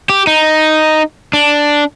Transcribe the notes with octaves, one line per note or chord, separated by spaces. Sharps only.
G4
D#4
D4